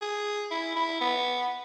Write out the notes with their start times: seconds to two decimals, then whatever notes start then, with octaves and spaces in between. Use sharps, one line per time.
0.02 G#4
0.51 E4
0.76 E4
1.01 B3